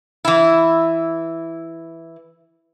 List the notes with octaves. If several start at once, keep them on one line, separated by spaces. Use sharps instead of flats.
E3 E4